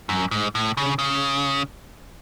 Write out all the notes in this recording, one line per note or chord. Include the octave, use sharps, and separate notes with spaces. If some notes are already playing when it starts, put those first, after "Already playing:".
F#2
G#2
A2
C#3
C#3